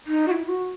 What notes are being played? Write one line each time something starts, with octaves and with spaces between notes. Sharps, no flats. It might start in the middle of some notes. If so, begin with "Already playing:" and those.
D#4
F#4
E4
F#4